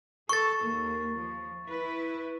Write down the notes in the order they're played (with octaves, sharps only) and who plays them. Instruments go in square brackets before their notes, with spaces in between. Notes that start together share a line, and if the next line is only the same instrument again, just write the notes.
[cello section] A4 [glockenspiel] C#6 A6
[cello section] D#2 A#3
F3
E4 B4